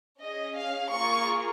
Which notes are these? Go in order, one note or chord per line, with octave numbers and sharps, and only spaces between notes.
C#4 G#4 D#5
F5
A#3 F4 G#4 C#6